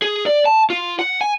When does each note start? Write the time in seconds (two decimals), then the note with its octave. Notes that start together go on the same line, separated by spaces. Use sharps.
0.02 G#4
0.26 D5
0.46 A5
0.70 F4
0.99 F#5
1.21 G#5